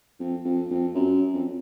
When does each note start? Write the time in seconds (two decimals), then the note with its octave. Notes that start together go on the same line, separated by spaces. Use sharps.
0.20 F2
0.45 F2
0.70 F2
0.94 F#2
1.33 F2